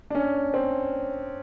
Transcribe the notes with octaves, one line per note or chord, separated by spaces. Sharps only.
D4
C#4
C4